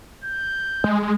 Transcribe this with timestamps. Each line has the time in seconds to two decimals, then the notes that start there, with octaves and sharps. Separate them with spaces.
0.24 G6
0.84 G#3